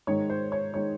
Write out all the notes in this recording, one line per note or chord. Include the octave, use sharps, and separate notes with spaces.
G#2 D#3 G#3 D#4 C#5
C5
C#5
D#3 G#3 D#4 C#5